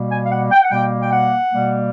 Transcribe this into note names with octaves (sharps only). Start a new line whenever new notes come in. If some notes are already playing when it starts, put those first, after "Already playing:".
Already playing: B2 G3 A#3
G#5
F5
F#5
G5
F#5
B2 G3 A#3 G5
G5
F#5
B2 G3 A#3